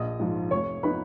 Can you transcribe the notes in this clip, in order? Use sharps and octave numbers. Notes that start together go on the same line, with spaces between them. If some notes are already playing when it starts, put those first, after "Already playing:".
Already playing: A#1 D#5 D#6
G#2 F3
F1 C#5 C#6
F3 B3 D#4 B4 B5